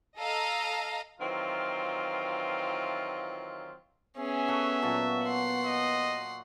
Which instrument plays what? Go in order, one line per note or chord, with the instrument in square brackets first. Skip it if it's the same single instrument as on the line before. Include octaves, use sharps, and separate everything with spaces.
[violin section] A4 D#5 F5 A#5
[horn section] D#3 E3 F#3 C4 F4
[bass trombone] B3 [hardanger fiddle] C#4 G#4 [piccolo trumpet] E5
[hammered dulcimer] F#4 A4
A#2 F#3 A5
[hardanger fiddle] F#5 C6
[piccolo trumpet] D#5